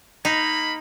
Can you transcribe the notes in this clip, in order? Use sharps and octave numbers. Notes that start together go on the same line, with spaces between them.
A#3 D#4 B5